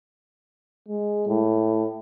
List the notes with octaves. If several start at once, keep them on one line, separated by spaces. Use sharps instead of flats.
G#3
A2